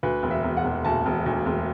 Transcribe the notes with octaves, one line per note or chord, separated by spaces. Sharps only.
D2 B4
E1
E5
E1
F#5
E1
D2 A5
E1
D2
E1